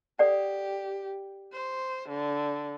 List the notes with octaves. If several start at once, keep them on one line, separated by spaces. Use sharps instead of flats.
G4 A4 D5 F#5
C5
D3